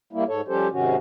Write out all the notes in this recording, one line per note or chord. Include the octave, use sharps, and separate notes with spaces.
G3 A#3 E4
G#2 A4 C#5
F3 G3 C#4 G4 A4 C5
G#2 C3 D#3 C#4 F#4